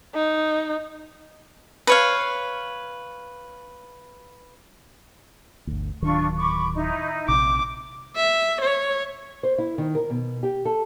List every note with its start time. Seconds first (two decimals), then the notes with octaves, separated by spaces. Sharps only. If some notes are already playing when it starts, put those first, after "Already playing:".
0.15 D#4
1.87 B4 C#5 F5
5.67 G1 D2
6.02 D1 D#3 F#3 D4 F4 C#6
6.37 B5 C#6 D6
6.75 D#4 E4
7.28 A#1 C3 D6
8.16 E5
8.61 C#5
9.43 C5
9.58 E4
9.78 D#3
9.95 A#4
10.10 B2
10.43 G4
10.65 A4